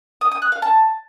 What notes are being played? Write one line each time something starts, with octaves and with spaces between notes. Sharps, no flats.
D#6
D#6
F#6
F5
A5